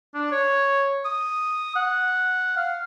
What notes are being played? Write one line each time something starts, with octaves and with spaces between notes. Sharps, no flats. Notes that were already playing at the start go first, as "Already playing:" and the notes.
D4
C#5
D#6
F#5
F5